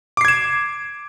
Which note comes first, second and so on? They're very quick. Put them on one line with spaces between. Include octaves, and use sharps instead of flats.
D6 C7 G#6 E7